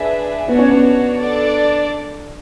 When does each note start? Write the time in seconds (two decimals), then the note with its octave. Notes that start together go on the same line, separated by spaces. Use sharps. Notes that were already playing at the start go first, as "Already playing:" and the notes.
Already playing: D4 G#4 B4 E5
0.48 B3 D4 F#4 C#5 F#5
0.59 C#4
0.71 B3
1.18 D4 A4 D5